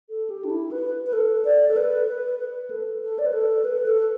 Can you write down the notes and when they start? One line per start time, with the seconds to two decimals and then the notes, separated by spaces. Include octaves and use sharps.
0.09 A4
0.30 G4
0.45 D4
0.51 E4
0.71 B4
1.06 B4
1.13 A4
1.45 D5
1.68 A4
1.76 B4
2.08 B4
2.39 B4
2.70 A4
3.02 A4
3.19 D5
3.26 B4
3.33 A4
3.65 B4
3.86 A4